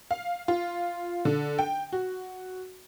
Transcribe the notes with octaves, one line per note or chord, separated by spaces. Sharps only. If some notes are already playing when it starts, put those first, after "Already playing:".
F5
F4
D3
G5
F#4